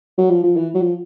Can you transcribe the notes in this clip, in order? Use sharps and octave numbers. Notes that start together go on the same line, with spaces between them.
F#3
F3
F3
E3
F#3
F3